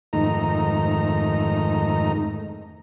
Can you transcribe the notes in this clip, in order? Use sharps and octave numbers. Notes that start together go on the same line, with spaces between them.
F2 G#2 D#3 A3 D#4 A#5